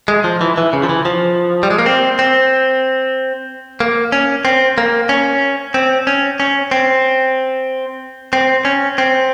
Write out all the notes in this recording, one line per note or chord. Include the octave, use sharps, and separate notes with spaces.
G#3
F3
E3
E3
C#3
F3
E3
F3
G3
G#3
A#3
C4
C4
A#3
C#4
C4
A#3
C#4
C4
C#4
C#4
C4
C4
C#4
C4